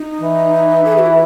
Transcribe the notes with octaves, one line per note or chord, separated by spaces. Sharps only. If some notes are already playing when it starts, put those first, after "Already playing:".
Already playing: D#4
E3
A4
G#4
F#4
E4